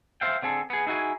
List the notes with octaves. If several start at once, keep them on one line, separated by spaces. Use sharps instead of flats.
C5 E5 F5 G5
D3 C4 G#4 A4
B3 G#4
D#4 E4 F#4 G#4 G#5